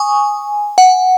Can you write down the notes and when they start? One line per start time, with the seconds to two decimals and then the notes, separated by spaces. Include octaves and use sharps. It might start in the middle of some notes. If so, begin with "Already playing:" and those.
Already playing: G#5 C#6 D#6
0.78 F#5